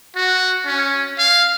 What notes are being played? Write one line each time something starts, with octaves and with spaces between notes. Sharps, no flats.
F#4
C#4
F5